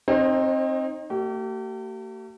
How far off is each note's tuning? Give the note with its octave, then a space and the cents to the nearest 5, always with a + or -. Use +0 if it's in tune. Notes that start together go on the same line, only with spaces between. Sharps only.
C4 +20 D#4 +0 C5 +45
A3 +40 G4 -40